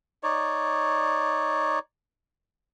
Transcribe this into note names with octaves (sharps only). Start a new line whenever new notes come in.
D#4 C#5 D5